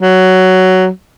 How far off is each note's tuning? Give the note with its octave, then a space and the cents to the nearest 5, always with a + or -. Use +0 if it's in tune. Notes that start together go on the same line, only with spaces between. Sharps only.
F#3 +10